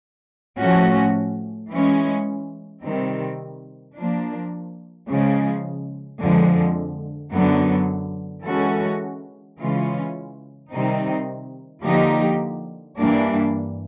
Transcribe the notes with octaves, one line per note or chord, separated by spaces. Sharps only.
A2 F3 A3 C#4 F#4
E3 G#3 C#4
C3 D#3 G3 C4
F3 A#3 D4
C#3 F3 G#3
F2 D3 F3 G#3
F#2 D3 F#3 B3
E3 G#3 C#4 F#4 A4
C#3 E3 G#3 C#4 F4
C3 D#3 G3 C4 D#4
D3 F3 A#3 D#4 G4
G2 E3 G3 A#3 D4